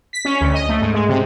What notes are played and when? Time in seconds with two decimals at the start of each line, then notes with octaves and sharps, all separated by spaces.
0.13 B6
0.25 C#4
0.41 D2
0.54 D#5
0.69 A3
0.81 G#2
0.94 G#3
1.09 C3